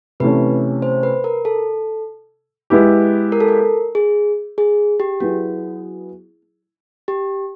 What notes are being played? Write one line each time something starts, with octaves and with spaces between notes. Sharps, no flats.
C3 E3 A3 C#4 B4
C5
B4
A#4
A4
G#3 B3 E4 G4
A#4
A4
A#4
G#4
G#4
G4
F#3 B3 E4 F#4 G#4
G4